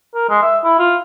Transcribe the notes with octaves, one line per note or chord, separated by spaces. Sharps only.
A#4
G#3
E5
E4
F4